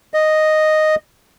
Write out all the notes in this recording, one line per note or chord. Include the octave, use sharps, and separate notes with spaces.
D#5